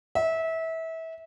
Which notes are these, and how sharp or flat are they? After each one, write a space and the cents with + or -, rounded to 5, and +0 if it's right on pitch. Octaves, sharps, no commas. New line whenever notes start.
E5 -25